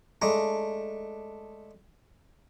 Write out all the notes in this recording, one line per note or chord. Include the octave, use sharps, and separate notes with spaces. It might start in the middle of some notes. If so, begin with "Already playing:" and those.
G#3 A3 D4 A#5